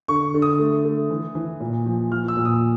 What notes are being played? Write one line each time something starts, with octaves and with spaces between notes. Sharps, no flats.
D3 C#6
D3
D#6
A3
A3
E3
E3
A#2
F3
F3 F6
E6
A#2
D#6